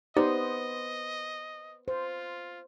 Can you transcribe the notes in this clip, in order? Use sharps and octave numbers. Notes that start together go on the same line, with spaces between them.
B3 D#4 G4 C5 D5 D#5
F4 C5